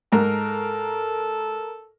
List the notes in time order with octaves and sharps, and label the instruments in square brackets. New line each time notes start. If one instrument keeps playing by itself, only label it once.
[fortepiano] G#2 [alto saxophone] A4 [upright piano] A#4